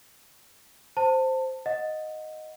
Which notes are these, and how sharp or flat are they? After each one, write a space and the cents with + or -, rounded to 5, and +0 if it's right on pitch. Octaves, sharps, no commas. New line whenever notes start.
C5 +0 A5 +25
D#5 +0 F#5 -20